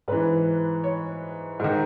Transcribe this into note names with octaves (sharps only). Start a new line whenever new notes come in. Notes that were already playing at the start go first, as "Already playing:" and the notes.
G#2 E3 B4
C#5
G#2 D#3